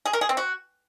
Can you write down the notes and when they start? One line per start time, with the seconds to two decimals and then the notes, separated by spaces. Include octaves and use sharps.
0.05 G#4
0.13 A#4
0.21 G#4
0.29 C4
0.37 F#4